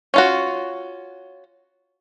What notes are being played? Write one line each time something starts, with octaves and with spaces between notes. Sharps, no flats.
C#4 F4 F#4